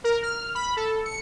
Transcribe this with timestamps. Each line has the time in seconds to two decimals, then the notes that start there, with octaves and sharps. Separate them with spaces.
0.04 A#4
0.23 F6
0.55 B5
0.77 A4
1.05 C#7